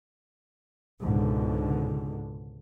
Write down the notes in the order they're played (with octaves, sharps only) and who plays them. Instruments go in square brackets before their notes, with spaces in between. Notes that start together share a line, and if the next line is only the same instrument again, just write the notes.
[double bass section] C#2 G#2 B2 D3